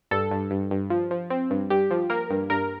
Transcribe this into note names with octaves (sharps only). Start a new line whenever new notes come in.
G2 A4
G2
G2
G2
F3
F3
C4
G2
G2 G4
F3
A#3 A#4
G2
G2 A#4